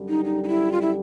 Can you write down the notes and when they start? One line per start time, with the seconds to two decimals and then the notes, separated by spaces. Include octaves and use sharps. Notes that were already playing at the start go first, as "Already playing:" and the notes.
Already playing: F#2 D3 G3
0.09 D#4
0.25 D#4
0.44 D#4
0.48 E4
0.72 F4
0.82 E4